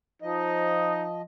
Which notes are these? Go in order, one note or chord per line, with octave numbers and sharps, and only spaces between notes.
F3 D#4 D#5